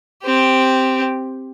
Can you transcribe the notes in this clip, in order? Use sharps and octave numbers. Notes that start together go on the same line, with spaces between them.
C4 G4